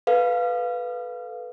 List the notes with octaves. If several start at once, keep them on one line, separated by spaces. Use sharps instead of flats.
A4 B4 F5